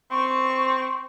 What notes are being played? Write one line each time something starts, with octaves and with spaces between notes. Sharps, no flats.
C4 C#6